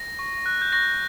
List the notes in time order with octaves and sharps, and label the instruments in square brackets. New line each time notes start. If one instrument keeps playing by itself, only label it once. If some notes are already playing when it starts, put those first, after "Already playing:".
Already playing: [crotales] A#6
C#6
F#6
G6
C#6 A#6